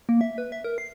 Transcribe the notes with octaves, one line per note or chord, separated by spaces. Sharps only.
A#3
E5
B4
E5
A#4
C7